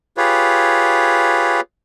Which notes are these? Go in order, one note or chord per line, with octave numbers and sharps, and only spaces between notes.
F4 G4 G#4 B4 C#5